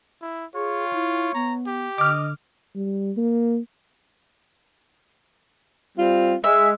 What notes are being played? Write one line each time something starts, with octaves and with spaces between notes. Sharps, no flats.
E4
F4 G#4 C#5
E4
B3 A#5
G4
D3 D#5 D6 F6
G3
A#3
G3 C4 F4
G#3 E5